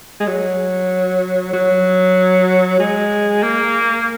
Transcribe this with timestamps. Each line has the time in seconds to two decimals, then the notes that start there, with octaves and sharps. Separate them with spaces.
0.20 G#3
0.27 F#3
1.53 F#3
2.80 G#3
3.43 A#3